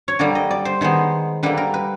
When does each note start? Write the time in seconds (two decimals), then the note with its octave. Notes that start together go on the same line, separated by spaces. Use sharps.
0.08 C#5
0.19 D3 G3 A#3 D5
0.35 D#5
0.51 D5
0.65 C5
0.81 D#3 G#3 B3 C5
1.43 D3 G3 A#3 B4
1.57 A#4
1.74 B4